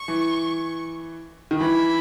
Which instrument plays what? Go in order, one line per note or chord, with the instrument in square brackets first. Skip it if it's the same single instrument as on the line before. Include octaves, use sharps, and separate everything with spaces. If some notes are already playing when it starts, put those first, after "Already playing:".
Already playing: [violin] C#6
[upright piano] E3
D#3
[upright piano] E3 [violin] B5